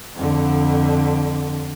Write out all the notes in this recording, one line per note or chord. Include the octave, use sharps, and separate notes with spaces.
F2 D3